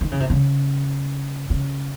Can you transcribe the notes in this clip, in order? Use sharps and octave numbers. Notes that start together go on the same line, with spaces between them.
D#3
C#3
C3
C#3
C#3